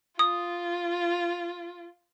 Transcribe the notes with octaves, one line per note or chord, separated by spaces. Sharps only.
F4 D#6